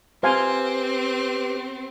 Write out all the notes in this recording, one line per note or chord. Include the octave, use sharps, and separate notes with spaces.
C4 G4 B4 C5 F5 G#5